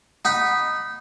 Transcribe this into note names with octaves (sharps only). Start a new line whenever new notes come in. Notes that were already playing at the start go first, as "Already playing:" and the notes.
D#4 F#5 B5